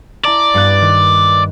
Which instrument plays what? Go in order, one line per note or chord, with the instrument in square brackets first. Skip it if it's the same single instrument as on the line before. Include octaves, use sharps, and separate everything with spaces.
[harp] E4 A5 A#5 [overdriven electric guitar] D5
[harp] G2 B3 F#6
D#3